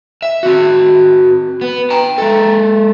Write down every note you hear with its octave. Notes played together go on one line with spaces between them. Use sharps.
E5
C4 F#4
B3
G5 A#5
G#3 A4